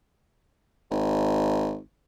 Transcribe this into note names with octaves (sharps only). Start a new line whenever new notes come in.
G#1